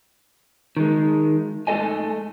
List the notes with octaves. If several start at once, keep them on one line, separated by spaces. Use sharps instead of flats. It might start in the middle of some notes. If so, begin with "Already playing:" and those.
D#3 G#3
G#2 A3 G#4 A4 D#5 G#5